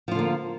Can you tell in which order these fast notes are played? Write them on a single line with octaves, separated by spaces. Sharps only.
F3 F4 D3 A#3